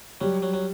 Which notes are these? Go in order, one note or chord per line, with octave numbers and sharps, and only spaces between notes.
F#3 G3
F#3
F#3